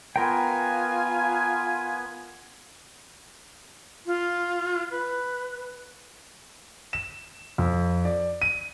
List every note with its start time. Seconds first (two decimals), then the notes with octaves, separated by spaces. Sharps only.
0.16 B3 F4 A#4 G5 G#5
4.06 F4
4.91 B4
6.93 E7
7.58 F2
8.05 D5
8.42 D#7